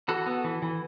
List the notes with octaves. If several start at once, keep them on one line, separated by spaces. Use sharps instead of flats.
E3 F#4 A4
B3
E3
E3